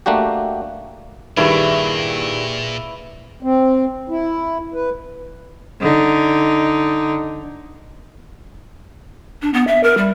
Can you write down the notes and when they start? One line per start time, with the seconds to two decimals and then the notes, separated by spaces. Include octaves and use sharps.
0.06 A3 A#3 D4 F#4 G4
1.37 G2 A#2 D#3 E4 G#4 B4 C#6
3.43 C4
4.09 E4
4.74 B4
5.81 D3 D#4
9.42 D4
9.54 B3
9.67 E5
9.83 A#4
9.97 G3